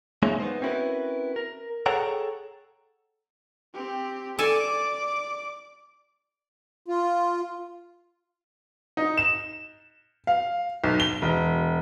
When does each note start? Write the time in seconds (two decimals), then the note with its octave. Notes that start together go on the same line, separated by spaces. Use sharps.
0.23 G#3 A#3 D#4 F4 C#5 E5
0.40 B3 D#4 C5
0.62 C4 C#4 E4 F#4 A#4 B4
1.36 A#4
1.86 G#4 A4 C#5 F#5 G5 A#5
3.74 C4 G4
4.39 A4 D5 G#5 A5 D6
6.88 F4
8.97 D#4
9.17 E7
10.27 F5
10.84 B1
11.00 G7
11.22 E1